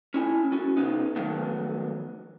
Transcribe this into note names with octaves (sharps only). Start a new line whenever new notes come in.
C#4 E4 G#5
C#4 F#4
C3 B3 D#4
D#3 F3 F#3 G#3 A3 B3